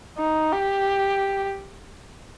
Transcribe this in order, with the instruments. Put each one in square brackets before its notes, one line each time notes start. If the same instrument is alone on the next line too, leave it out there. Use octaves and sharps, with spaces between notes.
[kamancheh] D#4
G4